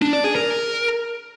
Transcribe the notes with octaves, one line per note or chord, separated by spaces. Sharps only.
D4
D5
G#4
A#4